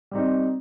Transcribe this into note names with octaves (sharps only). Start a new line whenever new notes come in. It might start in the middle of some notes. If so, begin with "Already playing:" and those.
G3 C4 D#4